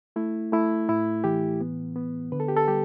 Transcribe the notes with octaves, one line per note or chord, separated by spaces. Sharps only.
A3 E4
A3 E4
A2 E4
E3 G4
B3
B3
D3 B4
A4
G4
A4
G3 G4